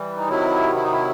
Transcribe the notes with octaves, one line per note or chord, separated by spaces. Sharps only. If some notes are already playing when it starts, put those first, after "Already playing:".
Already playing: E3 G3
D#4
C3 D#3 F#3 E4
E4
D#4
E4